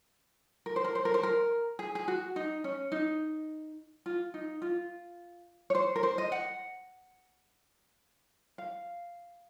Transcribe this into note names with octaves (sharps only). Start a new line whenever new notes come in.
A#4
C5
A#4
C5
A#4
C5
A#4
G#4
G#4
F#4
D#4
C#4
D#4
F4
D#4
F4
C#5
C5
A#4
C5
D#5
F#5
F5